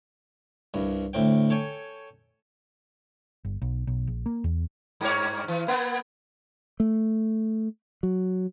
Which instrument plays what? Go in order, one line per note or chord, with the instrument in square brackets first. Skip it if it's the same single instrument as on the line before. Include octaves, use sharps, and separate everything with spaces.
[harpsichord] C2 G2
D2 A2 C4 G5
A4 C#5 G5 G#5
[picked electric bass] G1
B1
B1
A#1
A#3
E2
[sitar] G2 C#5
E3
A#3 B3
[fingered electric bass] A3
F#3